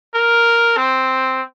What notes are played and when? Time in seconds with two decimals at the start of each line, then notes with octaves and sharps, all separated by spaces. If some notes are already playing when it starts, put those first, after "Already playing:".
0.14 A#4
0.77 C4